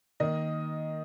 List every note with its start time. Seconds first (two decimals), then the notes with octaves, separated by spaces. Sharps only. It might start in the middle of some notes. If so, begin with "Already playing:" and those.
0.20 D#3 A#3 D#5